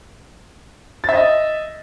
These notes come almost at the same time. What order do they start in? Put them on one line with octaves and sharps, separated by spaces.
A6 E5 D#5